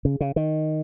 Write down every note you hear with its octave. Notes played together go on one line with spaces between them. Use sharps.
C#3
C#3
D#3